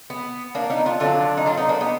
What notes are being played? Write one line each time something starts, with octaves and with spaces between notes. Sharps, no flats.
B3
A#3 D4
B3 D#4
D4 F4
D3 F#3 D4 F4
D#4
D4 F4
B3 D#4
A#3 D4
B3 D#4